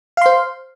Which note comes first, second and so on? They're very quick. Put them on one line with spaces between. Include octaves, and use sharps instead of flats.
F5 C6 C5